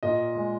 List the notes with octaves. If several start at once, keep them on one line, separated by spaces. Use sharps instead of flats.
A#2 D#5
G#3